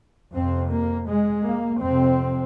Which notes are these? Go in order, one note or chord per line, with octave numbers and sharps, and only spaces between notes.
F2 C3 C4
A#3
G#3
A#3
F2 C3 C4